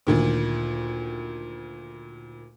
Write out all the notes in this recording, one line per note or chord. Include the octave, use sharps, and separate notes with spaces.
D2 A#2 D#3